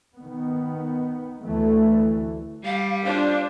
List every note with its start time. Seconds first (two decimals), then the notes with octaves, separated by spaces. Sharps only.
0.17 D#3 B3
1.45 D2 E3 A3
2.65 G3 F5
3.05 D4 F4 C5